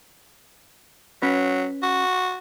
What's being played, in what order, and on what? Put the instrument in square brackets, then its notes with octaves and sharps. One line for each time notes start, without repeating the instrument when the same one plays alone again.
[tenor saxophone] F#3 [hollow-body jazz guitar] C#4 B4
[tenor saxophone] F#4